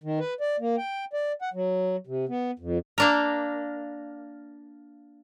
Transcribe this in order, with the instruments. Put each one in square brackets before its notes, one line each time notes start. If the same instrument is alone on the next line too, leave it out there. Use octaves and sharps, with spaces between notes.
[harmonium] D#3
B4
D5
A#3
G5
D5
F#5
F#3
C3
B3
F2
[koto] A#3 D4 A#4